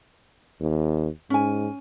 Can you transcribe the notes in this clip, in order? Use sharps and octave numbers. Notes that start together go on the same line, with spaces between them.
D#2
G#2 C#4 G#5